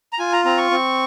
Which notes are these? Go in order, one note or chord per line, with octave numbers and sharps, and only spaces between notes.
A#5
F4 G#5
A#5
C4 A#5
C#6
C4